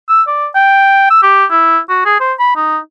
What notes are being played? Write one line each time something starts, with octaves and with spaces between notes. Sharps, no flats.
E6
D5
G5
E6
G4
E4
F#4
G#4
C5
B5
D#4